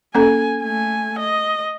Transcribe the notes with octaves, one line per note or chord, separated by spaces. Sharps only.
A#3 C#4 A4 G#5
A3 G#5
D#5